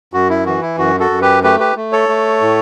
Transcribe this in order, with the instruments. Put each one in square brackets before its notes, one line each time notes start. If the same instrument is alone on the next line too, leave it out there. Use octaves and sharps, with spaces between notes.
[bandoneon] F#2 F#4
E4
E3 F#4
E4
F#2 F#4
F#4 A4
F#2
G4 B4
A3 G4 B4
G4 B4
A3
A4 C#5
A3
A2